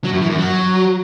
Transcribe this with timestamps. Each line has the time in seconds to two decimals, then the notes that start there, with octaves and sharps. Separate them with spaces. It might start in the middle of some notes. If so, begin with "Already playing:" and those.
0.04 F#3
0.13 F#2
0.21 E3
0.30 F#2
0.38 F#3